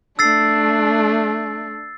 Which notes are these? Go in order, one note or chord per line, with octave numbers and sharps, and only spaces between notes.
A3 D4 E6 A6 C7